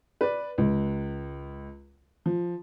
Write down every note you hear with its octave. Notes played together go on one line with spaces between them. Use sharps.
B4 D5
C#2
F3